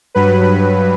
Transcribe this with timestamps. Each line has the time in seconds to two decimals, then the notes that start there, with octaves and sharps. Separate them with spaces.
0.15 G2 F#3 B4
0.43 B4